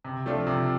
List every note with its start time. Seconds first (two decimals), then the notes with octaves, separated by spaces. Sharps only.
0.05 C3
0.26 F3 A3 D4 F4
0.47 C3